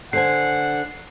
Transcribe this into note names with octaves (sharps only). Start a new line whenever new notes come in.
D3 C5 F#5 G#5 C7